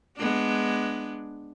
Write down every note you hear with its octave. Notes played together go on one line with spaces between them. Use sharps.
G#3 B3 D4